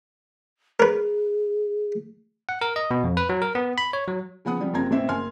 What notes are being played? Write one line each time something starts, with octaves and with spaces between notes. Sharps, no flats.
G#4 A#4 B4
F#5
A#4
D#5
B2
F2
B4
F#3
A#4
B3
B5
C#5
F#3
C#3 F3 B3 F#5 D#6
C3 F3 G3
F#1 C3 C4 F4 A#5 G#6
A1 B2 C4 C5 E5
F#1 G#5 C6 F6